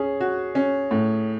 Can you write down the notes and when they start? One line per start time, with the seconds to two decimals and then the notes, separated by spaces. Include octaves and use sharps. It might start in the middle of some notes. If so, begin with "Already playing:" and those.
Already playing: C#4 G#4
0.21 F#4
0.55 C#4
0.91 A2